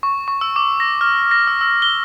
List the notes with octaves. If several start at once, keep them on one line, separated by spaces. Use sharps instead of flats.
C#6
C#6
E6
D6
A#6
F6
A#6
E6
E6
G7